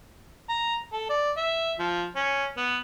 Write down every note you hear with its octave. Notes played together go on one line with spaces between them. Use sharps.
A#5
A4
D5
E5
F3
C#4
B3